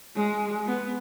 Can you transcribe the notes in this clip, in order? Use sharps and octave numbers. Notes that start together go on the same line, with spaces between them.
G#3
B3